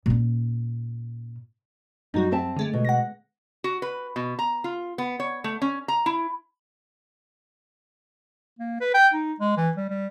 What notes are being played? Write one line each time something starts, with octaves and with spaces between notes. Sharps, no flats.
A#2 C#4
F#2 F#3 G3 D#4 F#4
C4 E5 A5
D3 G#3 A3
B2
F#5 A#6
F#4
B4
B2
A#5
F4
B3
C#5
A3
C#4
A#5
E4
A#3
B4
G5
D#4
G#3
E3
G3
G3